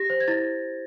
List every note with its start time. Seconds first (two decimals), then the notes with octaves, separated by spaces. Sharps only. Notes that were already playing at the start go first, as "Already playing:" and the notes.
Already playing: G4 A#6
0.10 C5
0.20 G#6
0.28 E4 A6